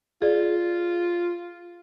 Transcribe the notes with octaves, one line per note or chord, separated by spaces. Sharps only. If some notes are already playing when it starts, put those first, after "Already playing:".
F4 G#4 D5